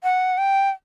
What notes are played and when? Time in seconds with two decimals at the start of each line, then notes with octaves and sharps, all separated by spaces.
0.03 F#5
0.38 G5